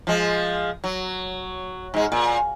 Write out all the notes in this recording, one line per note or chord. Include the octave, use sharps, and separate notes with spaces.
F3 G#3
F#3
G#2 G#3
A#2